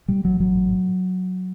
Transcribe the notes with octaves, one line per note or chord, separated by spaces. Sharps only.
A2 G3
A1 F#3
A1 F#3
A2
A2